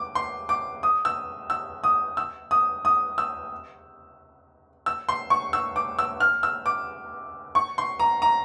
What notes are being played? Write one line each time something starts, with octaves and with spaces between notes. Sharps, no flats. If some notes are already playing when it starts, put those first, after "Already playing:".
Already playing: D6
C6
D6
D#6
E6
E6
D#6
E6
D#6
D#6
E6
E6
C6
C#6
E6
D6
E6
F6
E6
D6
C#6
C6
A#5
A#5